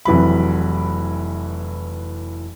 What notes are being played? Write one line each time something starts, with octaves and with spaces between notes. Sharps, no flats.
F1 E3 F#3 B5